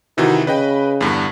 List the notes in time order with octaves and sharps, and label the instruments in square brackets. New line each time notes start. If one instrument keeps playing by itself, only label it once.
[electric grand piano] C3 D#3 E3 [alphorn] F#4
[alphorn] C#3 [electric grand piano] B4 D#5 G5
[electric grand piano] E2 G2 D3